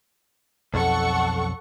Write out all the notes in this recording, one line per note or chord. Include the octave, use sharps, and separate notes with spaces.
B1 F2 A4 F#5 C#6